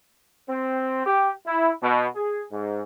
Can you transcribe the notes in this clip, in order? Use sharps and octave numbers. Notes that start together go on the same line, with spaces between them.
C4
G4
E4
B2
G#4
G#2